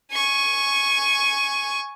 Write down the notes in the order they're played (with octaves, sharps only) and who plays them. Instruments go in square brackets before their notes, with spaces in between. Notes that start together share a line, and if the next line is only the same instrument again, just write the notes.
[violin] G#5 C#6